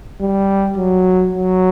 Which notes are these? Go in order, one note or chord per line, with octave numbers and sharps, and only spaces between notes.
G3
F#3
F#3